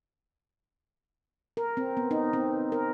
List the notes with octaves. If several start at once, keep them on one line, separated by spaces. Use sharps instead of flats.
A#4
C4
B3
D#4
C4
A#4